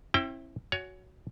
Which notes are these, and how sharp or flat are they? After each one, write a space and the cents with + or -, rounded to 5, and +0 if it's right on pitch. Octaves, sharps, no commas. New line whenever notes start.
C4 +45 E4 +0 G5 +5
F#4 +0 C#5 +25 G#5 +0